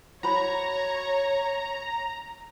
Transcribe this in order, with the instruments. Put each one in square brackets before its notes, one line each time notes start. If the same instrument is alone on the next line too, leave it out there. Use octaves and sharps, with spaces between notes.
[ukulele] F#4 C5 B5 [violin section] C#5 [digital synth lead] A#5